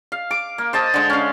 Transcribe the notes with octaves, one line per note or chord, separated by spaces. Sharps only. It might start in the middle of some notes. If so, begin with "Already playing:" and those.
F5
D6
A#3
C5 D#5 A5
D3 G#3
C#4 F5